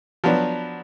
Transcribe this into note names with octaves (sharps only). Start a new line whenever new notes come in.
F3 F#3 B3 D4